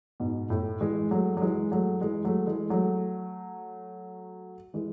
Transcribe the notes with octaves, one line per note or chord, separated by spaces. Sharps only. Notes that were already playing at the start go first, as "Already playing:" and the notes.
G#2 B2
A2
E3 G#3
F#3 A3
F#3
E3 G#3
F#3 A3
E3 G#3
F#3 A3
E3 G#3
F#3 A3
E3 G#3